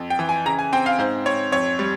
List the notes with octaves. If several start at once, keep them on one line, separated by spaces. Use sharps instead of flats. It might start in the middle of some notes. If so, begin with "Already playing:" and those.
Already playing: F2
G5
E3
G#5
C#3 A#5
G#5
C4 G5
F5
G#2 C5
C4 C#5
F2 C#5
G3